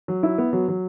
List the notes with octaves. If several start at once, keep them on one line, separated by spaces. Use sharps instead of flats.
F#3
E4
B3
F#3
F#3